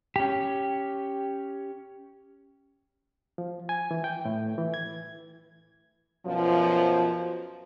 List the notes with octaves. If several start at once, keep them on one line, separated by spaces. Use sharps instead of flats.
C#4 G4
F3
G#5
E3
G5
A2
E3
G#6
F#2 B2 F3